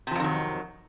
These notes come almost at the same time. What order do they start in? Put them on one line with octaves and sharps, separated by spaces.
C3 F3 F2 D#3 F#3